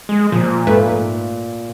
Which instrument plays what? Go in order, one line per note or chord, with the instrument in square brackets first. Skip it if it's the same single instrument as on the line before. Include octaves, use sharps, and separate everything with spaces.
[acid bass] G#3
[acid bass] A#2 [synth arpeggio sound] F3
[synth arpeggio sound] G#2 A3 B4